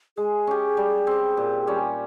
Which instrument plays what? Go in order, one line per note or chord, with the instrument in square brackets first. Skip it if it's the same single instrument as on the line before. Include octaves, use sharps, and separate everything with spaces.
[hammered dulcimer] G#3 [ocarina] G#4
[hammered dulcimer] C#4 G4
G3
C4 G4
A#2
G3 C#4